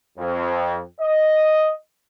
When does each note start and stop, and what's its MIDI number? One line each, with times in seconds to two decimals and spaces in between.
0.18 0.80 41
1.01 1.72 75